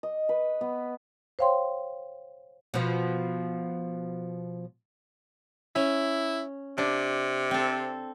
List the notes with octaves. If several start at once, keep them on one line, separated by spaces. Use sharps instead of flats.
D#5
B4
B3
C5 C#5 F5 G5 C6
B2 F3
C#4 E4
C3 D4
C4 A4